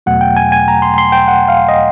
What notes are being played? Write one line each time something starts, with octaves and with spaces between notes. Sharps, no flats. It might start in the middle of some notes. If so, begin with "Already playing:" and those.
E2 B2 F#3 A3 F#5
G5
G#5
G#5
A#5
C6
C6
G5
F#5
F5
D#5